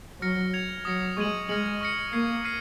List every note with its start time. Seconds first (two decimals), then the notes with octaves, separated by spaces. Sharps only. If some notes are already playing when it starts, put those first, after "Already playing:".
0.21 F#3 F6 A#6 C#7
0.53 G#6 C#7 F7
0.85 F#3 D#6 A#6 C#7
1.17 G#3 C#6 G#6 D#7 F#7
1.49 G#3 F6 A#6 C#7 F#7
1.81 C#6 F6 A#6 C#7
2.12 A#3 C#6 G#6 C7
2.45 F6 C7 D#7